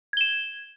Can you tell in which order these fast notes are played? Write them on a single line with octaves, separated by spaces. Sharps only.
G#6 G7 E7